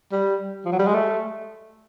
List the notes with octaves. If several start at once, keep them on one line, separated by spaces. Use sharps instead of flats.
G3
F3
F#3
G3
G#3
A3